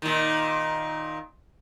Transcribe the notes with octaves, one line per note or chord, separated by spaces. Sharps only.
A#2 D#3